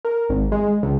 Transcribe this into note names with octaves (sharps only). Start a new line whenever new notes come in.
A#4
G#1
G#3
C#2